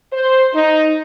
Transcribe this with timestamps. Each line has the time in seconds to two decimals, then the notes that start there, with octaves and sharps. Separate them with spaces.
0.13 C5
0.54 D#4